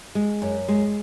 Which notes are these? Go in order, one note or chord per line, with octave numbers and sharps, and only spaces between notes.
G#3
F#2
G#3